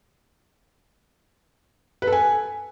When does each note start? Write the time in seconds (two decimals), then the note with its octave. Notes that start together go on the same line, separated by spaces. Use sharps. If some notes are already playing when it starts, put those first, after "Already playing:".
2.02 B4
2.07 A4
2.13 G#5